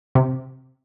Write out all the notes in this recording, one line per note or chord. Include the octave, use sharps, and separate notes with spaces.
C3